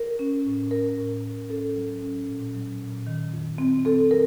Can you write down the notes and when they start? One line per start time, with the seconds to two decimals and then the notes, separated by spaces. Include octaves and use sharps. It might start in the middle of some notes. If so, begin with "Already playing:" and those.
Already playing: A#4
0.19 C#4
0.45 A2
0.71 A2 A#4
0.98 A2
1.24 A2
1.49 C#4 A4
1.76 F#3
2.02 C#4
2.28 A#2
2.55 F#3
2.81 A#2
3.07 D#3
3.33 F2
3.58 C4
3.85 C4 A4
4.11 F#3 A#4